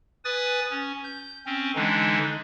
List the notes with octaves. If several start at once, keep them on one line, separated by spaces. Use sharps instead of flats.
B4 G#5 D#6 A6
C#4
G6
C4 C#4
D3 E3 G#3 D4 D#4